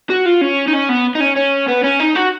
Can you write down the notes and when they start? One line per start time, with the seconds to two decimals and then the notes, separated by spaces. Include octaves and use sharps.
0.10 F#4
0.26 F4
0.41 C#4
0.68 D#4
0.73 C#4
0.89 B3
1.15 D#4
1.20 C#4
1.36 C#4
1.68 B3
1.83 C#4
1.99 D#4
2.15 F#4